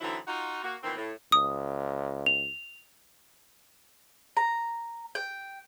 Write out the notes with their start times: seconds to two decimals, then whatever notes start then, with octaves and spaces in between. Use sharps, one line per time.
0.01 D3 E3 F#3 C4 D#4 E4
0.27 D#4 F4 F#4
0.63 A#3 F#4
0.83 A#2 D#3 E3 B3 C4
0.97 A2
1.32 C#2 D#6
2.26 F7
4.37 A#5
5.15 G5